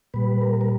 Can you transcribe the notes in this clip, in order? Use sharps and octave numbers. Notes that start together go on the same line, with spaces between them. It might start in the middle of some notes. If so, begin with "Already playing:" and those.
A#2 G3 B4
A#4
A#4